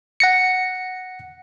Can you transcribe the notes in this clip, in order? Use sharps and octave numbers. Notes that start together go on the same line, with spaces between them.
F#5 A#6 C#7